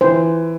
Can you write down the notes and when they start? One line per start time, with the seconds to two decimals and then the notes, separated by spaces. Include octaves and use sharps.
0.01 E3 C5